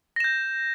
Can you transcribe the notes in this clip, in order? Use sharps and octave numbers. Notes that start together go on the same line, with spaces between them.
G6 A#6 E7